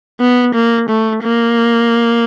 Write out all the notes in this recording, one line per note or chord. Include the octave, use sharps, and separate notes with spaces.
B3
A#3
A3
A#3